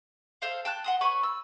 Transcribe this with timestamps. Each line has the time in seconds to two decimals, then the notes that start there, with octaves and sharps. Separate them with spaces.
0.42 A4 C5 F5
0.65 G5 A5 F#6
0.84 F#5 C6 D#6
1.01 B4 C#5 B5 C#6
1.23 E6